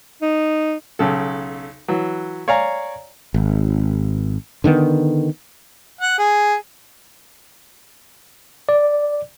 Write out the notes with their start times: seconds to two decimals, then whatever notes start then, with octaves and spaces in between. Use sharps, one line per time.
0.22 D#4
0.99 B1 C#3 A4
1.88 E3 F#3
2.48 C#5 D5 F5 G#5 A#5
3.34 G#1
4.64 D3 D#3 A#3 B3
6.01 F#5
6.19 G#4
8.69 D5